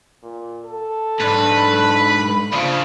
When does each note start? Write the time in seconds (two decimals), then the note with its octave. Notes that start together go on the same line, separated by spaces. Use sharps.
0.23 A#2
0.65 A4
1.20 G#2 D4 B4 B5
2.53 C#3 F3 D4 F4